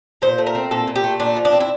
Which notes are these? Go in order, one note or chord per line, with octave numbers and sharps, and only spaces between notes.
A#2 C5
A3
A#4
C4
A#2 A4
A#2
G4
A3
A#2 D4
F3
D4
C4
E4